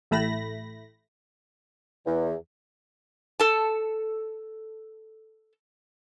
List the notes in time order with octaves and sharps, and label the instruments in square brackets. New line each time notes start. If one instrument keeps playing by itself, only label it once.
[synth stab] A1 A2 A3 B5 A#6
[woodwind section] E2
[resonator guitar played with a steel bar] A4 A5